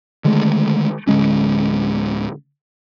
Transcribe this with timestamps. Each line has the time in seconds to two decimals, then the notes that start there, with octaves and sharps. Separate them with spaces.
0.24 D3 D#3 G#3 A3
1.07 D1 D3 G#3 C#4